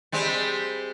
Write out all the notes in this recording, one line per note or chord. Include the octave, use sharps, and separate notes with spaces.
G3 G#3 C4